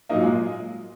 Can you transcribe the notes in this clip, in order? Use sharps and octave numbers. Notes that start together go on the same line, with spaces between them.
A#2 F#3 A#3 D#4 D#5
G#3 G#4